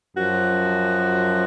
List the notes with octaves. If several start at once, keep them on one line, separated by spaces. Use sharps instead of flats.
F#2 F3 F#4